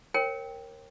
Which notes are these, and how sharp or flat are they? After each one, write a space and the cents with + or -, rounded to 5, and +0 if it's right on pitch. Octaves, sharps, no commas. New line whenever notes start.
A#4 -5 C#5 -40 G5 +0